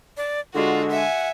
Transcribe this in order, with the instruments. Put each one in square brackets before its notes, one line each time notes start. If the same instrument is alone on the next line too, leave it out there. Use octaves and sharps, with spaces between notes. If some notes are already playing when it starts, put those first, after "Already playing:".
[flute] D5
[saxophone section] D3 G#3 [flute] F4 [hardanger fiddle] F#4
[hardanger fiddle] E5 G#5 [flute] F#5